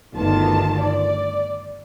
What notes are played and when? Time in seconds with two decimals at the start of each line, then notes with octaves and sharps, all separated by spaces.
0.14 G1 D2 D3 D#3 F4 A5
0.81 D5